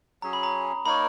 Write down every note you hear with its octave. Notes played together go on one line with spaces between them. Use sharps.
F#3 C#4 G#4 A#5
B5
A#5
A#3 D#4 A#4 C#5 B5